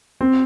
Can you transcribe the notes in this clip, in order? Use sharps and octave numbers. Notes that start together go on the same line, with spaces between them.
C4